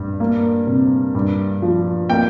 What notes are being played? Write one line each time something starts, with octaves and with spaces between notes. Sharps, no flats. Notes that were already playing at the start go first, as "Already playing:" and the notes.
Already playing: G2
A#3
C3
G2
F3
A#3 G5